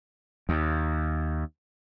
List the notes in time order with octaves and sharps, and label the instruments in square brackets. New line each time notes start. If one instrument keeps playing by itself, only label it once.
[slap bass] D#2